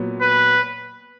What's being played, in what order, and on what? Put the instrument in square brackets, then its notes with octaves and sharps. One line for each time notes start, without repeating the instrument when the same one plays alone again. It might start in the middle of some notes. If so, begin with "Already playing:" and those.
Already playing: [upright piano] A#2 F#3 B3
[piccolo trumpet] B4